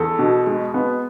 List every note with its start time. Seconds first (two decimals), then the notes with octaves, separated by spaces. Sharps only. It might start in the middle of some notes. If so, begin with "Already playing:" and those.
Already playing: E2 A4
0.19 B2
0.47 G#3
0.74 B3